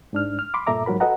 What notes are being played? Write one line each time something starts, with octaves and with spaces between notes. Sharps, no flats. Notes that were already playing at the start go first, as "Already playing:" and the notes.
G#2 D4 F6
F6
B5 C6 D6
G2 A#2 A4 E5 A#5 D6
G#2 F#3 F#4 A#4 B5
F#4 A4 B4 D#5 F#5 A#5